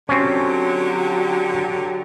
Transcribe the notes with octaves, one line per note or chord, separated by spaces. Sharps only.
D3 F#3 C4 C#4 G4